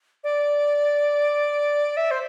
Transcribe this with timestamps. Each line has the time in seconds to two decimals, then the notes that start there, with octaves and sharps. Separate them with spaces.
0.24 D5
1.97 E5
2.11 C5